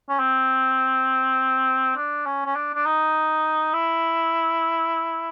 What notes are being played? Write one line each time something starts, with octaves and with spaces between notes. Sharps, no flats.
C#4
C4
D4
C#4
C#4
D4
D4
D#4
E4